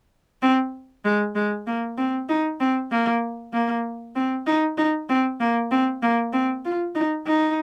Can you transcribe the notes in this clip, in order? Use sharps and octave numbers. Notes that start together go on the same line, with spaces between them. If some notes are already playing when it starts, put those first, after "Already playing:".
C4
G#3
G#3
A#3
C4
D#4
C4
A#3
A#3
C4
D#4
D#4
C4
A#3
C4
A#3
C4
F4
D#4
D#4